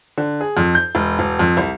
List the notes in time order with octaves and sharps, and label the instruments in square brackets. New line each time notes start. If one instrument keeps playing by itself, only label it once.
[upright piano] D3
G#4
F2
G6
E1
E1
F2
C2